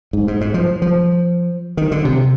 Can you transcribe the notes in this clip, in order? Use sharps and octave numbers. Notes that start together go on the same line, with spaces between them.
G#2
G#2
G#2
F3
F3
D#3
D3
C3